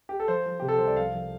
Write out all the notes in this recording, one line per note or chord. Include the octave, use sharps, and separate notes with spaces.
G4
A4
F3 C5
F3
C3 G4
A4
C2 C5
D5
F3 F5
F3